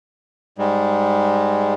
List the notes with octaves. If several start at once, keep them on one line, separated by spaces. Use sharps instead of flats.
G#2 G3 G#3